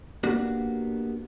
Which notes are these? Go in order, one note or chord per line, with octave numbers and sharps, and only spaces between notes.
A#3 B3 D4 F#4 G4